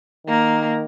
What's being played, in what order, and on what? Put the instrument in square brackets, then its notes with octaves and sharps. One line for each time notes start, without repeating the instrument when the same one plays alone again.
[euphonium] D#3 [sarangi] A#3